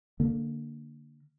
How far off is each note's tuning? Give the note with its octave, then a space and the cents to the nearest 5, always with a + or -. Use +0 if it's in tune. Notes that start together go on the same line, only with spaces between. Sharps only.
D3 +0 A#3 -10